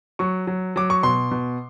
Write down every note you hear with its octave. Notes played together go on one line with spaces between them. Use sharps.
F#3 C#6
F#3
F#3 D6
C#6
B2 C6
B2